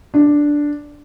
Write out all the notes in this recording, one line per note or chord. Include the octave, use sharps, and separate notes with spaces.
D4